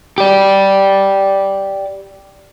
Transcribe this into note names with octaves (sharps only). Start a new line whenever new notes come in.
G4 D5